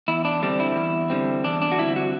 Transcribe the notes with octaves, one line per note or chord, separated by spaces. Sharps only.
E2 E4
D4
D3 G3 C4 D4
E4
E2
D3 G3 C4
E2 D4
D4
F#4
D3 G3 C4 E4
F#4